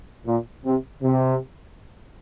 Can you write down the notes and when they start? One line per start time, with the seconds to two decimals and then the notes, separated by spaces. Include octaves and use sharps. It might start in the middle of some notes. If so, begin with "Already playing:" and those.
0.26 A#2
0.64 C3
1.02 C3